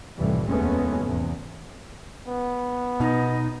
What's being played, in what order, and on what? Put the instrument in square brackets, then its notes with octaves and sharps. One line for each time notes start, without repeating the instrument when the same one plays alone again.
[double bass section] F1 C2 A2 E3 G3
F1 D#2 G#3 A3 B3 C#4
E2 G#2 C3
[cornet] B3
[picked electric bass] B2 [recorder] D#4